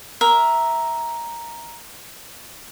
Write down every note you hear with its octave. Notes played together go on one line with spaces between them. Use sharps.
A#4 E5